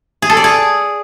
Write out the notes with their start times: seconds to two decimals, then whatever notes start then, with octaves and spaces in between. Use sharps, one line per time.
0.22 G#4
0.30 A4
0.37 D5
0.44 G#4